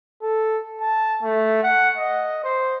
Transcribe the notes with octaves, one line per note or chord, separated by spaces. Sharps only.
A4
A5
A3
F#5
D#5
C5